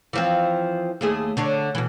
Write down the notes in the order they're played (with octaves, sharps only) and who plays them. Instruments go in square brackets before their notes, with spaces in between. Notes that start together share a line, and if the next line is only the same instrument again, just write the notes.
[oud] E3 F3 C4
D#2 A3 G#4
D3 D4 C#5
B2 E3